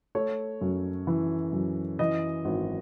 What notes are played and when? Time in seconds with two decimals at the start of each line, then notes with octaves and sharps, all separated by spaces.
0.15 A3 C#5
0.61 F#2
1.07 E3
1.53 F#2
1.99 E3 D#5
2.45 G#1